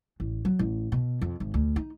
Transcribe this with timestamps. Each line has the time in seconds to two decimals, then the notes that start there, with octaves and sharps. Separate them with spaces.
0.20 A1
0.45 F#3
0.59 A1
0.92 B2
1.21 F2
1.40 G#1
1.54 D2
1.76 D#4